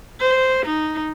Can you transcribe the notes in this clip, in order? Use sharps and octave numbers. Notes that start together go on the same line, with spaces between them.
C5
D#4